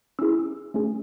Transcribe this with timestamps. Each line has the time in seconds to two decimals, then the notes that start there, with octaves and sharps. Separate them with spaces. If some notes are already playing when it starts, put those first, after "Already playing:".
0.19 C#4 E4 G#4 E6
0.74 A3 C#4 G#4